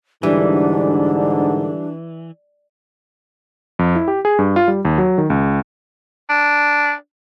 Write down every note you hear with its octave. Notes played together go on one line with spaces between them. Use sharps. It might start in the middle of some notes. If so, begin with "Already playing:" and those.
G#2 D3 E3 G3 D4
F2
E4
G4
G#4
G2
F4
G3
D#2
F#3
D#3
C#2
D4